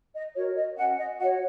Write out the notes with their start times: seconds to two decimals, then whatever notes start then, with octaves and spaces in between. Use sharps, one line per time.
0.14 D#5
0.35 F#4 A#4 C#5
0.55 D#5
0.77 C#4 F#5
0.98 D#5
1.19 F#4 C#5 F#5